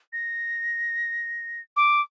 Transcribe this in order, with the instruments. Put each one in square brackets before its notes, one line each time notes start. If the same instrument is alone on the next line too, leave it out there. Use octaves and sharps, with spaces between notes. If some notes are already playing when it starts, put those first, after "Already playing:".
[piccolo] A#6
D6